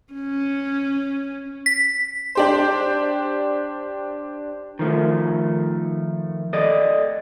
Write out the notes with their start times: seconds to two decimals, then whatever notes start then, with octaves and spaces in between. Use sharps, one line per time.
0.13 C#4
1.66 B6
2.35 D4 G4 C5
4.79 D#3 F3 A3
6.53 A4 D5 D#5